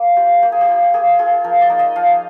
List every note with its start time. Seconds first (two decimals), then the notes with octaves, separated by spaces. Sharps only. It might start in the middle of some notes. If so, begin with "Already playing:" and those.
Already playing: A#3
0.16 F4 G4
0.42 A#3 G4
0.52 G#4
0.61 G4
0.68 F4
0.94 A#3 G#4
1.19 F4 G#4
1.44 F3 A#4
1.61 D5
1.70 A#3 D#4
1.79 D#5
1.96 F3 F5